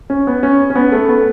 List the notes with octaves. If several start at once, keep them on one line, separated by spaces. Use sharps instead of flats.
C#4
B3
C#4
C#4
B3
A3
B3